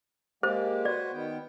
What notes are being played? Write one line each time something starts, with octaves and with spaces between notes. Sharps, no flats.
G#3 A#3 G4 C5
F#4 B4 C5 D5
D#3 B3 G5